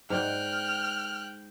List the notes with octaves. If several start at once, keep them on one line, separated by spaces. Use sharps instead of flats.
G#2 D5 F#5 G5 F6 F#6